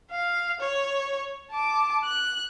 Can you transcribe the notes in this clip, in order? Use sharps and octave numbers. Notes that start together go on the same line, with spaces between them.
F5
C#5
A5 D6
F#6